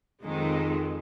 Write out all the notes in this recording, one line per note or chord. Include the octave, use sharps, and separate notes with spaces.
F2 D#3 G#3